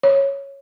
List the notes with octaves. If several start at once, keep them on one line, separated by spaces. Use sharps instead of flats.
C#5